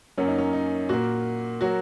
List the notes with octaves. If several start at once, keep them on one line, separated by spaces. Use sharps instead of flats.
F#2 F#3 A#3 C#4
D#4
C#4
D#4
A#2 A#3 F#4
F#3 A#3 F#4